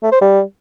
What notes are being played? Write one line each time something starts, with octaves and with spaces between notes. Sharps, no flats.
A3
C5
G3